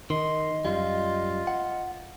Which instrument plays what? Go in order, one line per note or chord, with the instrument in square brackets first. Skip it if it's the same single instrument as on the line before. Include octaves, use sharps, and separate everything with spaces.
[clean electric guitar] D#3 [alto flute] D#5 [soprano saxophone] C6
[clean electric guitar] F#2 G3 [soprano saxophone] F4
[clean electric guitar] F#5